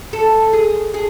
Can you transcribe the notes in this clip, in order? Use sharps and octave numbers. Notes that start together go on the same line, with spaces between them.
A4
G#4
G#4